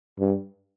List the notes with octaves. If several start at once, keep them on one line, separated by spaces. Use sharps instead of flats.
G2